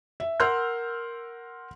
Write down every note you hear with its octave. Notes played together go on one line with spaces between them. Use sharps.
E5
A#4 F#5 C6 E6 F6 G6